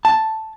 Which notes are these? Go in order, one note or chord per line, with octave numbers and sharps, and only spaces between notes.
A5